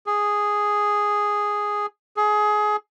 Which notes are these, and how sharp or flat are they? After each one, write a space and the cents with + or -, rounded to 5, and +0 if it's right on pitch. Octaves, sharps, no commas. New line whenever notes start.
G#4 -5
G#4 +20